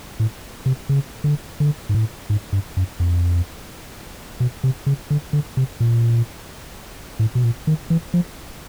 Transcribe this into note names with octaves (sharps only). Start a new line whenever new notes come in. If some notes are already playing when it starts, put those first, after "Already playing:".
A2
C3
C#3
D3
D3
G#2
A2
G#2
G2
F#2
F2
B2
C3
C#3
D3
D3
C3
A#2
A2
B2
A#2
D#3
E3
F3